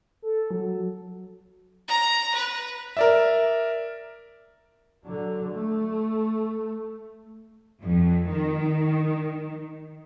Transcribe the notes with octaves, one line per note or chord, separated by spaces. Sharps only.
A4
F#3
A#5
B4
A#4 D5 E5
D3 F#3
A3
F2
D#3